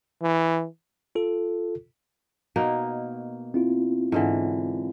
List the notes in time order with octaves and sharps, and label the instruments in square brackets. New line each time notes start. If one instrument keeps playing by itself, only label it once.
[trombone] E3
[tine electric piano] F4 A4
[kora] B2 A#3 D#4
[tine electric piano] C4 E4 F4
[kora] G#2 D3 E3